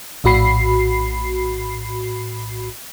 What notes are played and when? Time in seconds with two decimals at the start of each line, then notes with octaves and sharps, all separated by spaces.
0.24 A#1 A2 F#4 B5 C7